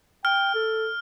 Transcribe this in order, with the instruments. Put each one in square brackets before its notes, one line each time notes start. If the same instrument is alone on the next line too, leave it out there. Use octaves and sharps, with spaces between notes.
[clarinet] G5 [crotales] F6
[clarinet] A4